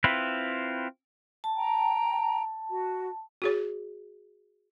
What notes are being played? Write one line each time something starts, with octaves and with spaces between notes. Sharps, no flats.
C4 E4 F4 B4
A5
G5 A#5
F#4
F#4 G#4 C#5